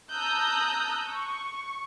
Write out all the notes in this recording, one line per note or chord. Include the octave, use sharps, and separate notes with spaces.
A5 A#5 D#6 E6 F#6 G6
C#6